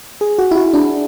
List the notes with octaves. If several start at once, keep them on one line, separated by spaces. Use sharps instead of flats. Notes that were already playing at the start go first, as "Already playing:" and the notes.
G#4
F#4
E4
F#4
D4